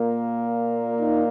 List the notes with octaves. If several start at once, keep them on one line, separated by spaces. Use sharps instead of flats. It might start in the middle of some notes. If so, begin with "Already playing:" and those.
Already playing: A#2 A#3
D#4